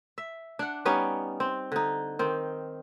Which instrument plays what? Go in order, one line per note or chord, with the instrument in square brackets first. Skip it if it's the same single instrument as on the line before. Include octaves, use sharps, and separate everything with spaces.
[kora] E5
D4 F#5
G3 B3 C#4 D#4
C4
D3 D#4
D#3 C4